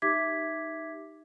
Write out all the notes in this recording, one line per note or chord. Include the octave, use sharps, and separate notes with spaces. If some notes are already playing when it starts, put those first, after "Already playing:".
D#4 G4 E5 D6 G#6 B6